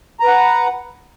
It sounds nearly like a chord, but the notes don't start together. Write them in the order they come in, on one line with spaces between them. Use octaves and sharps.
A#5 B4 F#5